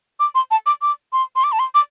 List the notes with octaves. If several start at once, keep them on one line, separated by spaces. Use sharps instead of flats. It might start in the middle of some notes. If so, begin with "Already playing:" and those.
D6
C6
A5
D6
D6
C6
C6
D6
A5
C6
D6